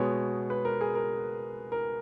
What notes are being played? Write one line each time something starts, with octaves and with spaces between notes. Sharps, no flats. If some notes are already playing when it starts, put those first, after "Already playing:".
Already playing: B2 G#3 B3 C#5
B4
A#4
G#4
A#4
A#4